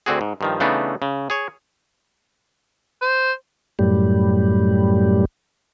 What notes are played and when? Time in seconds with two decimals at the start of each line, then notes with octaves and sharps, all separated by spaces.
0.06 D2 D3 C4 F#4 G#4
0.21 G#2
0.41 G2 D#3 F3
0.60 C#3 E3 A3 B3 D4 D#4
1.02 C#3
1.30 G#4 C#5
3.02 C5
3.79 F#2 A2 G3